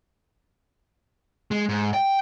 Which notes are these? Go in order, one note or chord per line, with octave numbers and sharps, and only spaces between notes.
G#3
G#2
G5